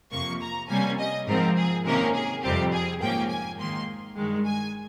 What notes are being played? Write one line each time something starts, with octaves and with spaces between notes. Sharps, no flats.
F2 C3 F3 A#3 C#6
A#5
C3 G3 A#3 C#4 G#5
D#5
G#2 F3 C4 A#4
G#4
C3 D#3 A#3 C#4 A#4
G#4
F2 C3 G3 C4 G4
G#4
G#2 F3 A#3 C#4 G5
G#5
G#2 D#3 A#3 C6
G2 D#3 G#3
G#5